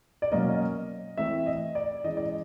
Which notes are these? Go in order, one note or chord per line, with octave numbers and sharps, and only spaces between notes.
D5
B2 F#3 A#3 C#4 D#5
E3 A3 C4 E5
D#5
D5
E3 G#3 C#4 D#5
D5
D#5